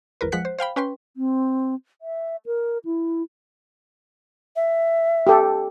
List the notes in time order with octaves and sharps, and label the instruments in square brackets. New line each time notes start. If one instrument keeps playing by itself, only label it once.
[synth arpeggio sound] G#1 E2 A#4 B4
F3 G#3 F#5 F#6 B6 C#7
C5
C5 F5 G5 B5
C#4 B4 G5 C6
[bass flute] C4
E5
A#4
E4
[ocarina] E5
[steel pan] G4 A4